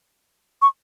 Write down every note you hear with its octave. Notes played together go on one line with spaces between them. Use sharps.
C#6